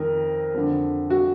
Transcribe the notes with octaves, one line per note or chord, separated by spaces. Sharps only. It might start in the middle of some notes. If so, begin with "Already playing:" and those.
Already playing: F2 D#3 A#4
F2 D3
F#4